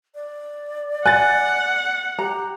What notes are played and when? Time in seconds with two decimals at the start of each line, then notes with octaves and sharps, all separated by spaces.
0.15 D5
1.06 F#5 G#5 F#6 A6
2.19 G4 A#5